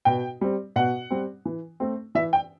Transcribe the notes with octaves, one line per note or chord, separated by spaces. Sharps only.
B2 G5
G3 C4
B2 F#5
G3 C4
E3
A3 C4
E3 E5
G5